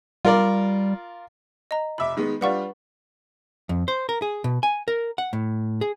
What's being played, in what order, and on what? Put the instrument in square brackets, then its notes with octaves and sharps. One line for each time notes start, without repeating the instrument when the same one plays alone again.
[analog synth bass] G3 [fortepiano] F4 A#4 D5
[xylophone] D#5 A#5
[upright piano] F1 E5 D6 [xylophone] B5
[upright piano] D#3 G#3 B3
[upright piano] G3 D4 F4 [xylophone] B4 F#5 C#6
[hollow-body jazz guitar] F2
C5
A#4
G#4
B2
G#5
A#4
F#5
A2
G#4